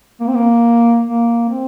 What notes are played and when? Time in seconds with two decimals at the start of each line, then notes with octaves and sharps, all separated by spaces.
0.20 A#3
0.27 C4
0.35 A#3
1.06 A#3
1.50 C4